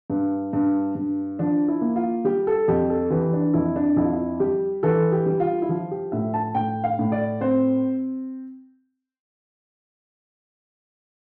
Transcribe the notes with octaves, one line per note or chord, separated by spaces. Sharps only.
G2
G2
G2
F3 D4
E4
A#3
F4
G3 G4
A4
F2 G4
A4
E3 G4
D4
F2 E4
D4
F2 E4
F4
E4
G3 G4
E3 A4
G4
G3
F4
E4
F3 F4
G4
A2 E5
A5
A2 G5
F5
A2
D5
C4 C5